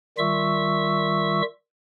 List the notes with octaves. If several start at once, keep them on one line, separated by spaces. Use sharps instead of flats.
D#3 G3 F4 E5 C#6 E6